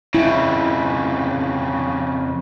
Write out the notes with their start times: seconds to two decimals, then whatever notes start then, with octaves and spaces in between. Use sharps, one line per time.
0.15 F2 C#3 E4